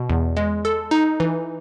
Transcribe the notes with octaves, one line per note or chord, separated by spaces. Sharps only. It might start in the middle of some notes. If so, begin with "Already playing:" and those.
Already playing: B2
E2
G#3
A4
D#4
E3